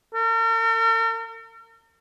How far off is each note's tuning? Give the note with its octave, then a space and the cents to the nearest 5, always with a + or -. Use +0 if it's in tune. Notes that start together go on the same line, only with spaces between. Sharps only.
A#4 -45